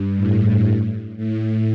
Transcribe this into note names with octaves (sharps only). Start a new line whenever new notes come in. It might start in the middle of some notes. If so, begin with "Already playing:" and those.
Already playing: G2
A2
A2